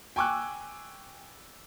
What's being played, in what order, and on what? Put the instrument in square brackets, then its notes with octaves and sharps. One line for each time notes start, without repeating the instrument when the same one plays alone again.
[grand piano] G5 G#5 C#6 D6 E6 F#6